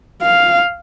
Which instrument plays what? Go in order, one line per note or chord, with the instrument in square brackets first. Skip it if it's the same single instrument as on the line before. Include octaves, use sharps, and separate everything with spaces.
[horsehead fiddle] F5